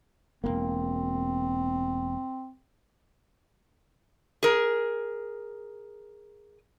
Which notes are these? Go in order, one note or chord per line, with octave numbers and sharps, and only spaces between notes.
E1 E2 A#3 C4
G#4 A#4